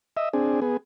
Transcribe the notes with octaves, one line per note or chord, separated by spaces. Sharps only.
D#5 E5
C4 D4 G#4
B3 G#4